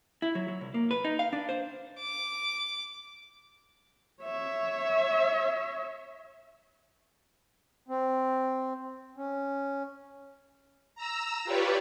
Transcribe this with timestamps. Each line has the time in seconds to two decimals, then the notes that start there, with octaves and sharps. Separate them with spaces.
0.22 E4
0.35 F#3
0.48 F#3
0.61 C2
0.74 A#3
0.91 B4
1.05 D#4
1.19 F5
1.33 D4
1.49 C5
2.00 D6
4.23 C#5 E5
7.88 C4
9.17 C#4
10.95 A#5 E6
11.44 F4 G4 B4 C#5 D5